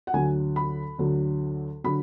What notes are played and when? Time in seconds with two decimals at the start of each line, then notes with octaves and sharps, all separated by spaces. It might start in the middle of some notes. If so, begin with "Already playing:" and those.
0.07 F#5
0.13 D2 D3 F#3 G#5
0.56 B5
0.98 D2 D3 F#3
1.84 D3 F#3 B5